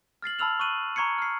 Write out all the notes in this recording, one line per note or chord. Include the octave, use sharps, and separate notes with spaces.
F6 A6 C7 F#7
A5 B5 E6 F6 F7 F#7
C#6 F6 F#6 D#7 F#7
A#5 C#6 G#6 C7 C#7
F6 C7